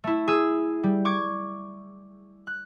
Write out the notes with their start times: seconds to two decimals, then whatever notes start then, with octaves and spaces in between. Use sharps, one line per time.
0.04 A3 E4
0.28 G#4 E6
0.83 G3
1.05 C#6 D6 G#6
2.47 F#6